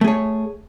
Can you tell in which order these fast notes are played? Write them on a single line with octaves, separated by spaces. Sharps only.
A3 G#4 C#5